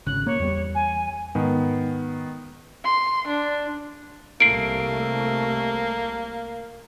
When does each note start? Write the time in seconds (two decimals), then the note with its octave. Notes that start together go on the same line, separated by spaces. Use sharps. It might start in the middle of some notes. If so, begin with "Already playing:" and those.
0.06 G#1 C#3 F#6
0.26 A#3 C#5
0.39 E2 G3
0.75 G#5
1.35 G#2 D#3 B3
2.84 C6
3.27 D4
4.40 C2 A3 A#3 C7 D7